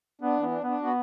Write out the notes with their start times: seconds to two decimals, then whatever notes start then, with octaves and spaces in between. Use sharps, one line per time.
0.21 B3 D4
0.36 E3 B3
0.51 D4
0.62 B3 D4
0.82 B3 F#4